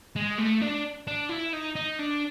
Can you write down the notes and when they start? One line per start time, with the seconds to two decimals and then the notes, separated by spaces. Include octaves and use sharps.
0.16 G#3
0.39 A3
0.61 D4
1.07 D4
1.30 E4
1.53 D#4
1.76 D#4
1.99 D4